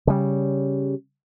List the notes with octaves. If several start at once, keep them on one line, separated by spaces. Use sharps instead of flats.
C#3 G3